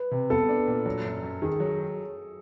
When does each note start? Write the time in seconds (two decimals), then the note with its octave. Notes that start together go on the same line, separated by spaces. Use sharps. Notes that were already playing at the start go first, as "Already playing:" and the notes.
Already playing: B4
0.11 C3
0.30 B3 A4
0.49 D4
0.67 A#2
0.86 F#3
1.05 F#2
1.23 F#2
1.42 D#3 G#4
1.60 F#3